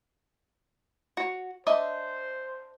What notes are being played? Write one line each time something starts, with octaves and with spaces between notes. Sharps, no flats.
F#4 C#5
D4 C5 D#5 E5